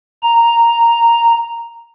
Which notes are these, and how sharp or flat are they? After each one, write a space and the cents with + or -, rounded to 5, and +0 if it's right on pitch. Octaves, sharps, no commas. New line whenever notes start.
A#5 +0